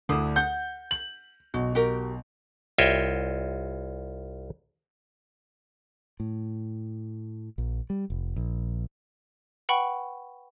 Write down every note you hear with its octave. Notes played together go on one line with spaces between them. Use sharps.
D2 D3 D4 E4 D#6
F#5 G6
F#7
B1 F#4
F#4 G4 A#4
C2 F4 C#5 D#5 E5 G5
A2
A#1
G3
F1
A#1
B4 F#5 G5 B5 C#6